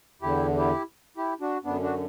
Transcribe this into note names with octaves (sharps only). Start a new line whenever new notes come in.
E2 D3 E4 G4
E4 G4
E4 G4
D4 F#4
F#2 D3 B3 D4
D4 F#4